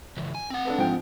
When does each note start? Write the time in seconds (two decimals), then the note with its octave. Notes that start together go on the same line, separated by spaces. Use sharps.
0.17 C#2 E3
0.35 G#5
0.50 C4 F#5
0.65 D4 A4 B4
0.78 G#2 F3 G5